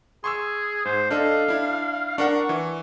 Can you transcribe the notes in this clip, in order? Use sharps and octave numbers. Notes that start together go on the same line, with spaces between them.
G#4 C6 C#6 E6
G#2 C5
D4 A4 D#5 F5
D4 E4
D4 A#4 F#5 C#6
E3